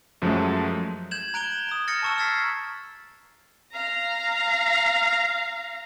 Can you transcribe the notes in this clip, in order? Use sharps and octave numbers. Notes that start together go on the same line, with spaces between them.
F#2 F3 F#3 G#3 A3 C#4
G6 G#6 E7 F#7
A#5 F#6 D7 E7 F#7 G7
A#5 D#6
F6 A6 A#6 C#7 E7
A5 C#6 E6
E6 F6 G#6 A6 B6 C7
F5 A#5